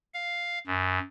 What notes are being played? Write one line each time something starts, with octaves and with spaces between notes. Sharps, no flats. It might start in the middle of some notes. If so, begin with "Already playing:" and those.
F5
F#2